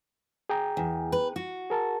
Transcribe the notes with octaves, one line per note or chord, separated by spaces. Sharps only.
G#4 G5 A#5
E2
B4
F#4
G#4 A#4 A5